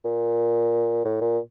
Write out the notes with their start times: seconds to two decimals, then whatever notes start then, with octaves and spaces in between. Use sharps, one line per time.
0.05 A#2
1.04 A2
1.21 A#2